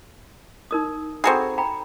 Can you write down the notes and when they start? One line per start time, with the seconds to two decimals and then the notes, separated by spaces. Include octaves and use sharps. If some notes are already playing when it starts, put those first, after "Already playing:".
0.71 D#4 A#4 D#6
1.24 C4 F#4 G#4 A4 A#5 B5
1.58 G5 A#5 B5